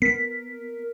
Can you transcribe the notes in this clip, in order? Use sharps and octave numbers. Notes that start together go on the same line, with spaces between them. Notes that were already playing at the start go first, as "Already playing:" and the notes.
B3 A#4 B6